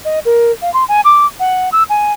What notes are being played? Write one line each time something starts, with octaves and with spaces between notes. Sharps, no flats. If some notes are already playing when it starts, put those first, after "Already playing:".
D#5
A#4
F5
C6
G#5
D6
F#5
E6
G#5